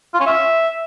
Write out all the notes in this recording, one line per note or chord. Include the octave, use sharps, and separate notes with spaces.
F4
C#4
E5